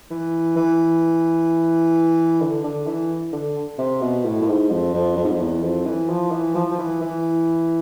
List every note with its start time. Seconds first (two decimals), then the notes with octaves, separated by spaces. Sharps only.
0.11 E3
0.56 E3
2.41 D3
2.64 D3
2.86 E3
3.33 D3
3.79 C3
4.02 B2
4.25 A2
4.42 A2
4.48 G#2
4.71 F2
4.94 F2
5.17 F2
5.24 G#2
5.31 F2
5.41 E2
5.63 F2
5.86 E3
6.10 F3
6.32 E3
6.55 F3
6.71 F3
6.79 E3
7.01 E3